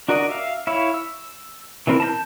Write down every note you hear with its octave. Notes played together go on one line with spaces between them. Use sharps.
D4 F#4 A#4 D5 D#5
E5 F5
E4 C#5 E5 F5
E6
E3 F#3 C4 E4 A#4
A5 A#5 G6